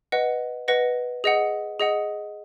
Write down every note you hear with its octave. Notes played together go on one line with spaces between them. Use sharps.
B4 D#5 F#5
B4 D#5 F#5 A#6
G#4 D#5 F#5
G#4 D#5 F#5